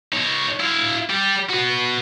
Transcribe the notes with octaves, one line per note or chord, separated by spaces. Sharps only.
D#4 C#5
E4 F5
G3
F#4 B4